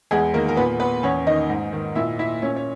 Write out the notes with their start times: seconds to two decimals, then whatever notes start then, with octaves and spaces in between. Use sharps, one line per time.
0.11 E2 G#3 G#4
0.34 D#3 A#3 A#4
0.48 A#4
0.57 A#2 B3 B4
0.80 B3 B4
1.03 E2 C#4 C#5
1.27 D#3 D#4 D#5
1.50 G#2
1.73 D#3
1.95 A#2 E4 E5
2.19 E4 E5
2.42 A#2 C#4 C#5
2.56 C#5